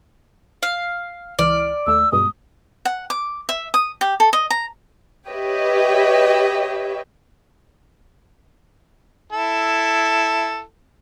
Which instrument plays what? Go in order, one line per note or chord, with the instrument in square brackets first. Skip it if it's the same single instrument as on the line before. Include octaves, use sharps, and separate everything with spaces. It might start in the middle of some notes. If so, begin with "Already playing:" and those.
[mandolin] F5
[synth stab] C#2 E3 F6 [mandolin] D5
[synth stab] D#2 A3 [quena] E6
[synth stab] G2 B2 G#3 [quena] D#6
[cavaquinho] F#5
D6
E5
D#6
G4
A4
D#5
A#5
[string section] G4 B4 C#5 D#5 E5 G5
[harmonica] E4 A4